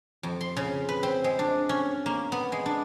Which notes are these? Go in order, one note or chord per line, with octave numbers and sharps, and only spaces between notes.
F2
C6
C#3
B4
C4
G#3
D4
C#4
A#3
B3
G#3
D4